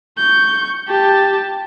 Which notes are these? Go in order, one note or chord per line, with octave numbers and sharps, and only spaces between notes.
C#6 G6
G4 A5